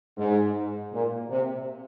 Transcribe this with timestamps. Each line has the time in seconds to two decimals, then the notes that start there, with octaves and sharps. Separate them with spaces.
0.17 G#2
0.92 A#2
1.30 C3